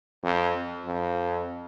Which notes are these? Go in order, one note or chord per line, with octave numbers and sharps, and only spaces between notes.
F2
F2